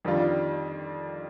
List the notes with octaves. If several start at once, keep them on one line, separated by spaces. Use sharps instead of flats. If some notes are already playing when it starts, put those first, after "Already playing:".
F2 D#3 G3 D4 F4